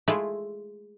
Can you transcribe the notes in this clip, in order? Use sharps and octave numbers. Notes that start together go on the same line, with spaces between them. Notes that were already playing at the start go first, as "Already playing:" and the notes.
G#3 A3 E4 F4